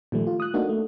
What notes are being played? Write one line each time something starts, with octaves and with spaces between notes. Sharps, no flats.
A#2 D#3 F3 G3 A3
F4
D#6 F#6
A3 A#3 D4 D#4 F#4
A3